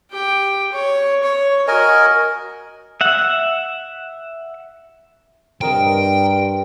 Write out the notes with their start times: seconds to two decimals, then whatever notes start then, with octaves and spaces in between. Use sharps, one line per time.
0.11 G4 G5
0.72 C#5
1.23 C#5
1.68 F#4 A#4 D#5 G#5
3.01 E5 F#5
5.61 G2 C4 A#4 D#5 G5